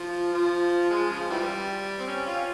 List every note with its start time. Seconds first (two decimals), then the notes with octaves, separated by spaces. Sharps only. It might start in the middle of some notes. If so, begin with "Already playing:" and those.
Already playing: F3
0.33 F3
0.90 G#3
1.11 C#3 F3
1.30 E3 G3
2.00 C4
2.07 C#4
2.26 C#4 F4